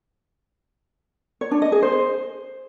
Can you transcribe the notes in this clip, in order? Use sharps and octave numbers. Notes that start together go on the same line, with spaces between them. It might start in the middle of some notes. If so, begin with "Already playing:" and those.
C#5
D4
D#5
G#4
C5